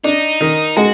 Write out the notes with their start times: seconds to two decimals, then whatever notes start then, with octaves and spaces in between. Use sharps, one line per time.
0.04 D4 D#4
0.41 D#3
0.77 G#3 F#4